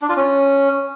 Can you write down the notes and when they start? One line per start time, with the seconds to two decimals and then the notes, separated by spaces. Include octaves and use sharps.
0.02 D4
0.09 F4
0.16 C#4